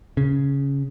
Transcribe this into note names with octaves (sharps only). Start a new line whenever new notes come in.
C#3